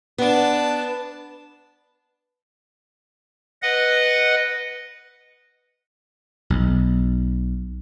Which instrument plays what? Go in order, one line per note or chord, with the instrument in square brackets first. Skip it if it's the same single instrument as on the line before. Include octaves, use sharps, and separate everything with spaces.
[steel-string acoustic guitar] B3 [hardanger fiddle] D4 A5
[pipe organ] B4 D#5 F#5
[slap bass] B1